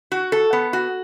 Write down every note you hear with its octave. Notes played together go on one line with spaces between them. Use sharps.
F#4
A4
B3
F#4